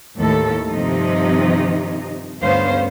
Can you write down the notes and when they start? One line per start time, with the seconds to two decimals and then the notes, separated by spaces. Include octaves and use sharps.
0.17 D#2 A2 A4
0.71 G2 C3 D#3 F3 D#4
2.41 D2 G2 B3 C#4 C5 F5